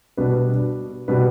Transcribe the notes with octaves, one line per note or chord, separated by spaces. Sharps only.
B2 G3 D4 B4
B2 G3 D4 B4